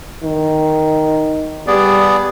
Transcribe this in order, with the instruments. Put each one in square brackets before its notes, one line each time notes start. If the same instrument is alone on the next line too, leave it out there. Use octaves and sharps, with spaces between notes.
[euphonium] D#3
[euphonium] G3 [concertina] B3 G#4 D5